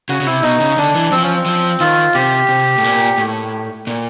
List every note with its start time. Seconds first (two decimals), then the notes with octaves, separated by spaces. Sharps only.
0.09 C#3 F#4
0.21 C#3
0.26 C3 E4
0.43 B2 D#4
0.60 C#3
0.78 D3 D4
0.95 E3
1.11 F3 C4
1.23 C#4
1.35 C4
1.46 F3
1.80 D#3 F4
2.14 C3 G4
2.49 C3
2.78 A2
2.84 A#2
3.18 A2
3.87 A#2